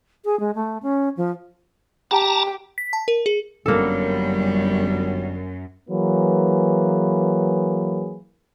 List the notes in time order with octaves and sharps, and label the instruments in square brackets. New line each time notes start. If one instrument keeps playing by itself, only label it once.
[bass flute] G#4
G#3
A3
C#4
F3
[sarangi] G4 [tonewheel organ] A5 A#5
[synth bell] B6
A5
A#4
G#4
[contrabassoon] G1 [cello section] F#2 [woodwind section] G3 [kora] A#3 A4
[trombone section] E3 F#3 A#3 G#4 B4